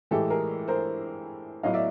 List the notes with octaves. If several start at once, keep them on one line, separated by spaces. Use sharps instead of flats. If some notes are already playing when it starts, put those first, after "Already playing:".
A2 E3 G#3 G4 A4
G#4 A#4
A#4 C5
A1 A2 F#3 B3 D#5 F5
D5 E5